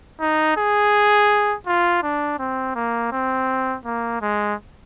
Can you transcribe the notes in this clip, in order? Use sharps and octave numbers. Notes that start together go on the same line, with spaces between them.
D#4
G#4
F4
D4
C4
A#3
C4
A#3
G#3